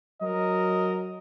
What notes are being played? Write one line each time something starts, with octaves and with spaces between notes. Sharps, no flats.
F#3 A#4 D#5